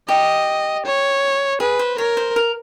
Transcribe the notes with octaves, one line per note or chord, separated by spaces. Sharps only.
G4 D#5
C#5
G#4 B4
C5
A#4 C#5
C5
A#4